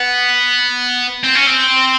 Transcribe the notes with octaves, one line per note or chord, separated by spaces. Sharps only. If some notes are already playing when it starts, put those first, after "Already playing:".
Already playing: B3
C4
C#4
C4